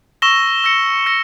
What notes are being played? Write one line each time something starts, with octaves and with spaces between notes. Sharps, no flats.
C#6 E6 A#6 E7 G7
E6 A#6 C#7
E6 A#6 C#7